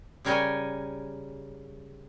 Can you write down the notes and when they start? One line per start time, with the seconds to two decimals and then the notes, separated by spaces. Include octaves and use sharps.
0.25 C#3 G3 A#4 C#5 G5 G#5